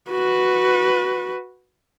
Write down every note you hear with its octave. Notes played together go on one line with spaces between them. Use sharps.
F#4 B4